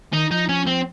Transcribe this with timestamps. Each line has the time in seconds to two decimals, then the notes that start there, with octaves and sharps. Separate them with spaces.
0.12 D#3 D#4
0.31 F3 D#4
0.49 C#4
0.67 C4